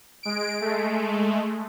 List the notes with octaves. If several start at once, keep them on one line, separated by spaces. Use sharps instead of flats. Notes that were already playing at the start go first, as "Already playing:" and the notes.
G#3 D7
G#3 A3